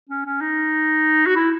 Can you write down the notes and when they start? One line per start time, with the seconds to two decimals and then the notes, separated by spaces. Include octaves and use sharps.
0.10 C#4
0.26 C#4
0.41 D#4
1.26 F#4
1.36 E4